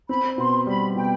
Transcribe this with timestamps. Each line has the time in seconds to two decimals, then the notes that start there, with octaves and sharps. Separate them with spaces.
0.09 C4 B5
0.38 B2 C6
0.67 G3 B5
0.96 B2 G5